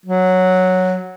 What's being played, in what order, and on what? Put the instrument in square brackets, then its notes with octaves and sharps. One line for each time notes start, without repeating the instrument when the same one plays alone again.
[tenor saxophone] F#3